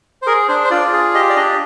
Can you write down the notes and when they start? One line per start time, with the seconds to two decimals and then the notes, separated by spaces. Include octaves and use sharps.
0.22 C5
0.27 G#4 A#4
0.49 D4 C5
0.65 C5
0.71 F4 D5
0.93 G#4
1.14 G4 D#5
1.30 D5
1.36 D4 D#5